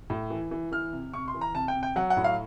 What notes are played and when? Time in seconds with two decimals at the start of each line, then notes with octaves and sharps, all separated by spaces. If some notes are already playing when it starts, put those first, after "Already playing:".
0.10 A2
0.30 E3
0.51 E3
0.71 E3 F6
0.93 C3
1.14 C3 C#6
1.28 C6
1.34 E3
1.41 A#5
1.55 C3 A5
1.68 G5
1.75 C3
1.83 G5
1.96 F#3 F#5
2.10 F#5
2.17 A2
2.24 F5